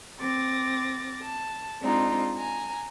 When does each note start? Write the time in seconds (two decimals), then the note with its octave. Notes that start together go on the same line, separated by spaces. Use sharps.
0.20 C4 D6 A6 A#6
1.22 A5
1.81 G#3 C4 D4 D#4 F4
2.35 G#5 A#5